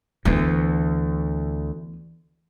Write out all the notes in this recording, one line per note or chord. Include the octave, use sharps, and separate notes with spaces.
D2 E3 B3